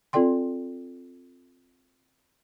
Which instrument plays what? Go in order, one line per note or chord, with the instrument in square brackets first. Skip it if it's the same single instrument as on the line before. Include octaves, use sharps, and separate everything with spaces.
[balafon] C4 F4 A4 D5 G5 C6